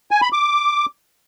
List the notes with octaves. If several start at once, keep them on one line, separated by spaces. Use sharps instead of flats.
G#5
B5
D6